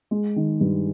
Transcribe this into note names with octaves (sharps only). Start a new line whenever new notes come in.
G#3
D#3
G2